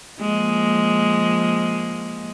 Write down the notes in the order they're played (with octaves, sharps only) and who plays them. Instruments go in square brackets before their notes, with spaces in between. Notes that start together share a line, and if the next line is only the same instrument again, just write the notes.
[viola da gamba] F3 G#3 A#3